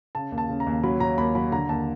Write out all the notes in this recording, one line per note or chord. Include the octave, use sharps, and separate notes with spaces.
C#3 A5
D#2
A5
C#3
A#5
D#2
F#3 B5
F#3 A#5
D#2 B5
F#3 B5
D3 A#5
D#2 A5